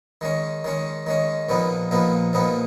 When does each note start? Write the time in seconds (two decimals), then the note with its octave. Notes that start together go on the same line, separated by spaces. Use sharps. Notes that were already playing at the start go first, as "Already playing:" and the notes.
0.21 D#3 G#3 C#4
0.64 D#3 G#3 C#4
1.06 D#3 G#3 C#4
1.49 A#1 A#2 F3 B3 D#4
1.91 A#1 A#2 F3 B3 D#4
2.33 A#1 A#2 F3 B3 D#4